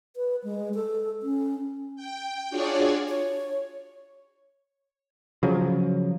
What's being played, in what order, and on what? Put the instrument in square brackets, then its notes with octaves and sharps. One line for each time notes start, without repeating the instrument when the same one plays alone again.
[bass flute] B4
G#3
A4
C#4
[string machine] G5
D4 F4 F#4 G#4 C#5 D5
[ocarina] C#5
[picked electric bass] C#3 F3 F#3